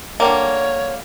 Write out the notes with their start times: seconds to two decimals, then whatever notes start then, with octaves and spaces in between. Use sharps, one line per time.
0.20 D3 G3 A#3 C#5